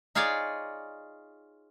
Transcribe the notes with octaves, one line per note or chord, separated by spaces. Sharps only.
D#4 F4 G#4 C#5 D5